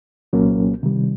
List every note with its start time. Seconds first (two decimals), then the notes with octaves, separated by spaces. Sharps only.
0.33 C2 A#2 F#3 A#3 C#4
0.83 C3 D#3 G3